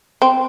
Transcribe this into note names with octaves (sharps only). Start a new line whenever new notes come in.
C4